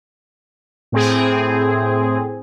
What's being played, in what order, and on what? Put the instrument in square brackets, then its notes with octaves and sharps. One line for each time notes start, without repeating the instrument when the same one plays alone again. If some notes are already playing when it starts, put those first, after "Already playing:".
[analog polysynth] A2 C4 G#4